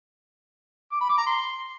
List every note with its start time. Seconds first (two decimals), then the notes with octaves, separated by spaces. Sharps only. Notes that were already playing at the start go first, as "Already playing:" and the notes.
0.92 D6
1.01 B5
1.09 D6
1.18 A#5
1.27 C6